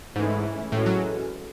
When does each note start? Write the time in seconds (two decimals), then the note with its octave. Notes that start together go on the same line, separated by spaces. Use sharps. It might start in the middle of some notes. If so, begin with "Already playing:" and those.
0.15 G#2 E3 A3 C#4 E4
0.72 A2 E3 G#3 C#4 F#4 A4
0.86 F#3